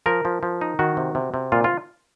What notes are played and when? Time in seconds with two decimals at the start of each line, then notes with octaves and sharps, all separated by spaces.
0.06 F3 A#4
0.25 F3
0.43 F3
0.61 D#4
0.79 D#3 F#4
0.97 C3
1.15 C3
1.34 C3
1.52 A#2 F4
1.64 F4